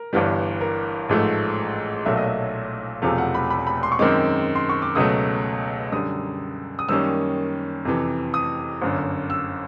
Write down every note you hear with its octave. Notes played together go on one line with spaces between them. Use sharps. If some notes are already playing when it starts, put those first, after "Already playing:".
Already playing: A#4
G1 G2 E3 G3
A#4
A1 G#2 F3 A3
B1 A#2 F#3 A3 E5
D#5
E5
E1 E2 C3 F3 A3 F5
F#5
B5
B5
B5
C6
C#6
F#2 D#3 G#3 C4 D6
C6
C#6
D6
C#2 B2 F#3 A3 D#6
F#2 D3 G3 D#6
D#6
F#2 D#3 G3 A#3 C#4 E6
F2 C3 E3
D#6
G1 F#2 D3
E6